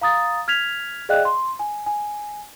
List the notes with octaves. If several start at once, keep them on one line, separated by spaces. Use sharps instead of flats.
F5 A#5 D#6 A6
F6 G#6 B6 F7
G#4 D5 D#5 F5 G5 F#6
C6
G#5
G#5